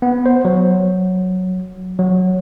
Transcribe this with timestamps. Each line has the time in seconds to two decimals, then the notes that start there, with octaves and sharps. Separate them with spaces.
0.02 B3
0.26 C5
0.45 F#3
1.99 F#3